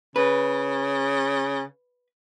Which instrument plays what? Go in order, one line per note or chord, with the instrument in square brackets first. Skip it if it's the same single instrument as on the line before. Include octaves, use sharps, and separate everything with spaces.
[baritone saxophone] C#3 [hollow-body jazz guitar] B4